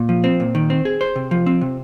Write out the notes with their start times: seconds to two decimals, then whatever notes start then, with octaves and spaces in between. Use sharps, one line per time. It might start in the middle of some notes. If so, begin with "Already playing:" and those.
Already playing: A#2
0.09 F3
0.24 C4
0.40 A#2
0.55 D#3
0.70 C4
0.85 G#4
1.01 C5
1.16 C3
1.31 F3
1.46 C4
1.61 C3